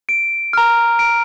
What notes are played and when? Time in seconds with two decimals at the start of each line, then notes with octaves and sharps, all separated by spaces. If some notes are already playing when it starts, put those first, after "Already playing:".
0.09 D7
0.53 A#5 F6
0.99 D7